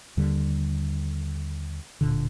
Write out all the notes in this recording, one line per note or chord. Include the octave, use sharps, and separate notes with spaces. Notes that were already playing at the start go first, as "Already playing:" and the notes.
D#2 D3 G3
D1 A#2 D3